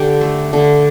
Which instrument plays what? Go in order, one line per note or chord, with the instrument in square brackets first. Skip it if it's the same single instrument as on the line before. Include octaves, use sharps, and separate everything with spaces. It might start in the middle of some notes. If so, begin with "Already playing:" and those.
Already playing: [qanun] D3 G4
A3
D3